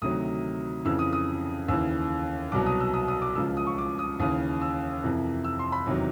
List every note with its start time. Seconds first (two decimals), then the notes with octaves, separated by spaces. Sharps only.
0.02 D2 C3 D#3 F#3 D#6
0.85 F2 C#3 E3 E6
0.99 D#6
1.13 D#6
1.68 D#2 C#3 E3 E6
2.52 C2 B2 F#3 D6
2.66 D#6
2.80 E6
2.94 D#6
3.08 D#6
3.22 D6
3.35 C#2 C#3 F3 E6
3.57 D#6
3.67 C#6
3.78 D6
3.99 D#6
4.20 D#2 C#3 E3 D#6
4.62 E6
5.04 F2 C3 E3
5.44 E6
5.59 C6
5.72 B5
5.86 E2 C3 D#3 F#3